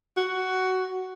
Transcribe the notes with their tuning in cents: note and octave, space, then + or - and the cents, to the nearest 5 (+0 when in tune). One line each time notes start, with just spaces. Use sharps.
F#4 +10